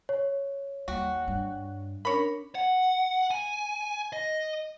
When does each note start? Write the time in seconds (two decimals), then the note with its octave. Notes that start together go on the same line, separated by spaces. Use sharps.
0.09 C#5
0.88 D#2 G3 F#4
1.28 G2
2.05 C#4 D4 A#4 C#5 B5
2.55 F#5
3.31 G#5
4.13 D#5